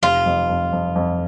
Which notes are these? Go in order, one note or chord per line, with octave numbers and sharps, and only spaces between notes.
F1 F4
F2
F2
F2
F2